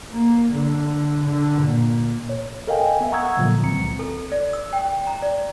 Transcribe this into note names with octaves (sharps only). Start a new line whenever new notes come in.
A#3
D3
D3
A#2
C#5
A4 A#4 D#5 F5 G5 G#5
B3 E5
F#5 A#5 C#6 D#6 E6 G#6
A#2 D3 F3 F#3
C#2 C4 A#5 C#7
A4
D5
E6
G5
A#5
D5